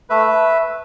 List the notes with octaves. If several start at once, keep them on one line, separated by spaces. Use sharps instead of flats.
A3 B4 E5